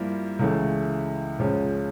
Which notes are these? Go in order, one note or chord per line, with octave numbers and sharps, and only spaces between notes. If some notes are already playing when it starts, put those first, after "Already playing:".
Already playing: G2 F3 A#3 E4
C#2 C#3 E3 A3
C#2 C#3 F3 C#4